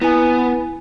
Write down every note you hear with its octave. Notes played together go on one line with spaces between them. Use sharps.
B3 E4 G#5